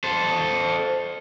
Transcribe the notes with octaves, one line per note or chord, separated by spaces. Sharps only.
A4 C5